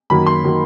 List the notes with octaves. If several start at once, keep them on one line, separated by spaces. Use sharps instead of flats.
F#2 D#3 F#3 A#3 B5
C6
D#3 F#3 A#3